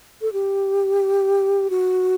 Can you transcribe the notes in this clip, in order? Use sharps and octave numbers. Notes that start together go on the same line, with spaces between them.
A4
G4
F#4